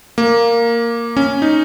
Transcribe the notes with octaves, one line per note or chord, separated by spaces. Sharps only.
A#3
C#4
D#4